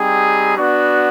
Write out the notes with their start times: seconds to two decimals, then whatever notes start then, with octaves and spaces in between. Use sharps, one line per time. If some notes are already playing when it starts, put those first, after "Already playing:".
Already playing: G3 C4 D#4 G4 G#4
0.57 B3 D4 F#4